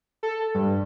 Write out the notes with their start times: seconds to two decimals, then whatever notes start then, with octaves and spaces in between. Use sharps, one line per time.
0.23 A4
0.54 G2